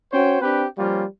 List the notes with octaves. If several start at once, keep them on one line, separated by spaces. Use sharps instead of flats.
C#4 F#4 C5 C#5 G5
C4 D4 G4 B4 G5
F3 G3 A#3 C#4 F4